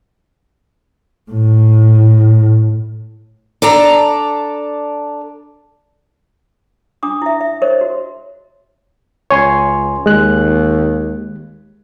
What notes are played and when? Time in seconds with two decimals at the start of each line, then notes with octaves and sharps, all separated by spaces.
1.31 A2
3.62 D4 A4 D5 A#5
7.03 D4 D6 D#6
7.22 E4 E5
7.41 E5
7.62 A#4 C5 C#5 D#5
7.81 F#4
9.31 C#2 C#5 G#5 C6
10.06 D#2 G#3 F#6